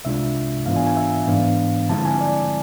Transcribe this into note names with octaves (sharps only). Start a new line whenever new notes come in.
C2 C3 G#3 D4 F4 E5
G#2 E3 B3 D4 F4 F5
G#5
G#5
E5
G#2 E3 B3 D4 F5
D3 F3 G#3 C4 E4 A5
G#5
D5